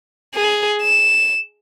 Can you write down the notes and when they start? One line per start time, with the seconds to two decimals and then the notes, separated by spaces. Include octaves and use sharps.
0.35 G#4
0.82 E7